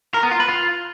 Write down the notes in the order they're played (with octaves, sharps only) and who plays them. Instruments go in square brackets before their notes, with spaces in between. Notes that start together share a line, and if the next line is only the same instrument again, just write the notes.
[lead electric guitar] A#4
B3
F4
B4
F4